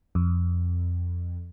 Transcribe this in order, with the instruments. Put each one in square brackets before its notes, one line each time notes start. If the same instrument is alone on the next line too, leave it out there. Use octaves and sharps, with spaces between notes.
[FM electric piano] F2